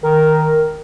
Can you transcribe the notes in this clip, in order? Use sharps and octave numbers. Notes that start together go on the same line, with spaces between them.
D#3 A#4